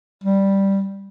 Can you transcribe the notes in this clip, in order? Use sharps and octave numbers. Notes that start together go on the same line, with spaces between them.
G3